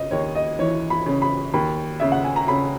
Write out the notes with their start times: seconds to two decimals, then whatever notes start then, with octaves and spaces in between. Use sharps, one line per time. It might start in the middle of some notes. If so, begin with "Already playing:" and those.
Already playing: C#3 D#5
0.11 D#2 C#5
0.35 D#5
0.59 E3 C#5
0.90 B5
1.06 C#3
1.22 B5
1.54 D#2 B5
2.00 C#3 E5
2.12 F#5
2.24 G#5
2.36 A#5
2.48 C#3 B5